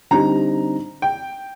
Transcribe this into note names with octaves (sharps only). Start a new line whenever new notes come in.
D3 G3 C4 D#4 G4 A#5
G5